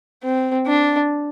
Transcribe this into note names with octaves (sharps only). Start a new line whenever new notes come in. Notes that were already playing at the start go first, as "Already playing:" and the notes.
C4
D4